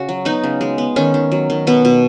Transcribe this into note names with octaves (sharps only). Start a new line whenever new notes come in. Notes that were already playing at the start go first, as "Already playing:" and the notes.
Already playing: C#3 F#4
F#3
B3 D#4
C#3
G#3
B3
D#3 C#4
D#3
F#3
D#3
B2 B3
B2